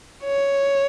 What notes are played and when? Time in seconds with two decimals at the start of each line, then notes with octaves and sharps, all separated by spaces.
0.24 C#5